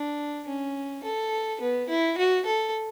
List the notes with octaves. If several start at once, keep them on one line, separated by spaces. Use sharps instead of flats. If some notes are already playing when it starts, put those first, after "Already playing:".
Already playing: D4
C#4
A4
B3
E4
F#4
A4